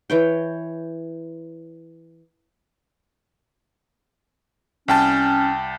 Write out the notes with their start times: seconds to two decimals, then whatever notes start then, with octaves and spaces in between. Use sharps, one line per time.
0.10 E3 C#5 G5
4.88 C2 C#4 G5 A5